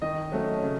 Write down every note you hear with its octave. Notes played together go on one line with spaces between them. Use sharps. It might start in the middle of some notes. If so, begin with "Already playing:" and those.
D#3 D#5
F#3 A3 C#4
C#3